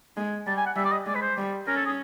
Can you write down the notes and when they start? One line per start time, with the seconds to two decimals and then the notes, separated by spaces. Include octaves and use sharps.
0.17 G#3
0.47 G3 A5
0.57 G#5
0.66 F#5
0.76 G3 E5
0.85 D5
0.92 D#5
1.06 G#3 D5
1.15 B4
1.21 C5
1.37 G3
1.67 C#4 A#4
1.76 A4
1.86 G#4